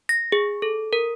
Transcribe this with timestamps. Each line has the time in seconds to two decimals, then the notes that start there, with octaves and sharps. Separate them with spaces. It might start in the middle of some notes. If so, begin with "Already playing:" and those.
0.09 A#6
0.32 G#4
0.62 A4
0.93 A#4